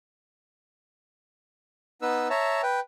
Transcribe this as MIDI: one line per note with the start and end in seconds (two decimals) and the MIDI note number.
2.02 2.28 59
2.02 2.28 63
2.02 2.28 71
2.02 2.28 88
2.30 2.62 73
2.30 2.62 76
2.30 2.62 81
2.30 2.62 82
2.63 2.80 71
2.63 2.80 79